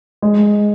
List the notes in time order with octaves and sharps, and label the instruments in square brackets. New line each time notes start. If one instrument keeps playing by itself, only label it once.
[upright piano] G#3